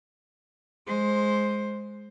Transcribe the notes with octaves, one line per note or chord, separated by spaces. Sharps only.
G#3 C5